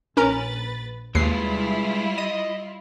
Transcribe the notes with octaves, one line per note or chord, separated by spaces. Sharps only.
A#1 C#4 A#4 B4 A#5 A6
D#2 G3 G#3 E4 F4 B4 C7
D#5 D#7